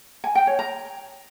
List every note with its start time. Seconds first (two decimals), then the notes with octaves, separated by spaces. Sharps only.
0.24 G#5
0.35 G5
0.47 C#5
0.59 A#5